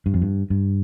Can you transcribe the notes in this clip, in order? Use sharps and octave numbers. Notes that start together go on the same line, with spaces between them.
G2
F2
G2
G2